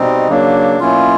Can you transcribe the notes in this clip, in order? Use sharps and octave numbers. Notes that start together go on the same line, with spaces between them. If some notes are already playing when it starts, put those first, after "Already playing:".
Already playing: B2 G3 C4 D#4
C#3 F#3 A#3 D4
B2 F#3 A#3 C#4 E4 F4